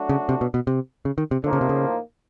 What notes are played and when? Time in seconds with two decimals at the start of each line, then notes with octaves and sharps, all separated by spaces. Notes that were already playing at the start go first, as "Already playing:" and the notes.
Already playing: F#3 A3 D4 F#4
0.09 C#3
0.29 C3
0.41 B2
0.54 B2
0.67 C3
1.05 C#3
1.18 D#3
1.31 C3
1.43 A2 D3 F3 A#3 D#4
1.53 C#3
1.61 C3
1.69 C#3